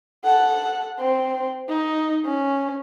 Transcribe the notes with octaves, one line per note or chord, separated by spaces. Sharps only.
A4 F#5
C4
D#4
C#4